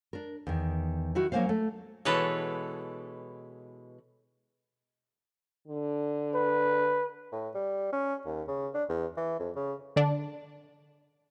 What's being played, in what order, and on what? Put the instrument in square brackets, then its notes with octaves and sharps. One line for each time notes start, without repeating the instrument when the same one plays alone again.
[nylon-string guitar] D4 A#4
E2 D#3
D#3 E4 F#4
F#3 A#3 C4 C#4 C5 F5
A3
[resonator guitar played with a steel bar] B2 E3 G#3 [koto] A4 B4 C#5
[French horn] D3
[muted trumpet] B4
[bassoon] A2
G3
C#4
D#2
C#3
D4
E2
E3
F2
C#3
[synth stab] D3 D4